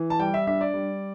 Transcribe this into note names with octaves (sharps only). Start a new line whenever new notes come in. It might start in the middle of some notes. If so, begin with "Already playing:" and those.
Already playing: E3
A5
G3 G5
E5
D4 E5
D5
G3